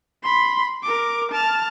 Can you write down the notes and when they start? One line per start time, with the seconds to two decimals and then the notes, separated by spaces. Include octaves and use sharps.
0.23 B5 C6
0.83 A#4 D6
1.32 A5 F6